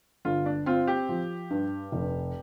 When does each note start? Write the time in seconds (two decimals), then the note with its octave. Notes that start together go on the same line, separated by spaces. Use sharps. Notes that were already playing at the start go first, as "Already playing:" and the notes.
0.25 G1 F4
0.46 D4
0.66 C4 F4
0.87 G4
1.09 F3
1.50 G2
1.92 F1